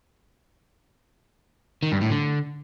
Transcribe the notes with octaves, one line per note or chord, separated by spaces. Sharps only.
D#3
G2
A2
D3